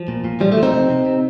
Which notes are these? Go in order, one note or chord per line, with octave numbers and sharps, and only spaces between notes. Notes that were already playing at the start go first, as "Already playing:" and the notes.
Already playing: F3
A#2
A#2
F3 G3
A3
F3
C4 D#4
C3
C3
C3